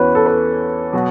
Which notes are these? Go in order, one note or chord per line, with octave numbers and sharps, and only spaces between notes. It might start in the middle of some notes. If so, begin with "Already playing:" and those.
Already playing: E2 E3 C#4 F#4 B4 C#5
A4
B4
B2 F#3 B3 F#4